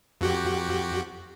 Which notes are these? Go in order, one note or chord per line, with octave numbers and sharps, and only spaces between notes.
F2 F#4 G4